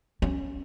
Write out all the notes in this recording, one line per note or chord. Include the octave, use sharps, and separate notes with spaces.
C#4